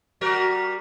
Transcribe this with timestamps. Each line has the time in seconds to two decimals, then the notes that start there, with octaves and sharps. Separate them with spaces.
0.21 G3 F#4 A#4